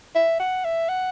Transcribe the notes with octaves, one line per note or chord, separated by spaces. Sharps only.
E5
F#5
E5
F#5